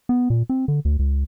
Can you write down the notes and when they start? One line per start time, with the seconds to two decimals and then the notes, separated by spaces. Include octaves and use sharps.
0.09 B3
0.30 A#2
0.49 C4
0.68 D3
0.85 D2
0.99 C#2